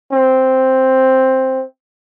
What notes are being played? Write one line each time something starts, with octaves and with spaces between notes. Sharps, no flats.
C4